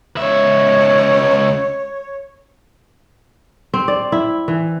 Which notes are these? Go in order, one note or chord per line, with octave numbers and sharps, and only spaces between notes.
C#2 C#5 E5
C4
D5
E4
E3